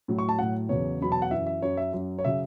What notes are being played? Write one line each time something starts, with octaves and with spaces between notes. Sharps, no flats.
A2 F#3
C#6
A5
A2 F#3 F#5
E2 C#3 F#3 C#5
E2 B2 F#3 B5
A5
F#5
F#2 E3 E5
E5
F#2 F#3 C#5
E5
F#2 F#3
C#5
C#3 F#3 E5